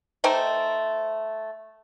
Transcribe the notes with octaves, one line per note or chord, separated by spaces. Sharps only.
A3 D#4 C5 G5